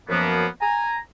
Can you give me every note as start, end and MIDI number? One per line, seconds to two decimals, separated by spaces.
0.10 0.46 42
0.10 0.46 53
0.10 0.46 58
0.10 0.46 59
0.61 0.97 80
0.61 0.97 82